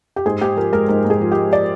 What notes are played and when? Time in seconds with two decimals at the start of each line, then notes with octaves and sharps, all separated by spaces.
0.16 G4
0.26 G#2 G#4
0.41 G#2 G4
0.56 F3 A#4
0.73 G#3 A#4
0.88 G#2 A#4
1.05 G#2
1.10 G#4
1.21 F3
1.32 G#3 G4
1.53 D5